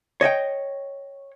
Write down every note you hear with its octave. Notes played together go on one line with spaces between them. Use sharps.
C#5 D#5 E5 G5